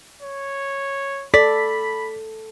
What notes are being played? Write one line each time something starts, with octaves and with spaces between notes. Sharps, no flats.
C#5
A4 D5 B5 B6